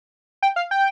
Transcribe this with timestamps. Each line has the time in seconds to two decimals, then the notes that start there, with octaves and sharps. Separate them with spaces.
0.43 G5
0.56 F5
0.71 G5